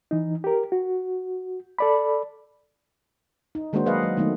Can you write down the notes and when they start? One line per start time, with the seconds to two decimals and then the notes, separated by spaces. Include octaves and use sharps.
0.11 E3 D#4
0.44 G4 A#4
0.72 F#4
1.79 A4 D5 B5
3.55 D#4
3.73 D#3 G#3 A#3 D4 F#4 C5
3.86 F#3 G#4 B4 D#5 F5 F#5
4.03 F#3
4.17 D#3 F#3 A3 B3 D#4